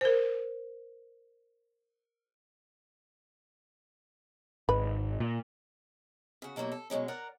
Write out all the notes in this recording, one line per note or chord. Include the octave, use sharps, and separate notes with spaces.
A#4 C5
G#1 B4
A#2
C#3 F#4
B2 F#3 G3 A#3 E4
A4
B2 F#3 G#3 C#4
A#4 D5 F#5 A#5